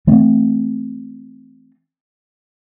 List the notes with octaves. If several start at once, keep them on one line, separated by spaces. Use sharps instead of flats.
E3 A3 C4